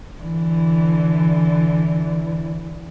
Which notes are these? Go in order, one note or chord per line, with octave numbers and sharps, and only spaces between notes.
D3 E3